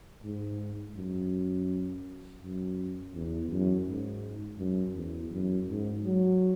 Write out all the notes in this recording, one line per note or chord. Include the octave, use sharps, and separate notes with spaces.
G#2
F#2
F#2
E2
F#2
G#2
F#2
E2
F#2
G#2
F#3